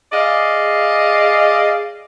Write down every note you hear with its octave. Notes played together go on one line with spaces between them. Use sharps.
G#4 D5 D#5 F5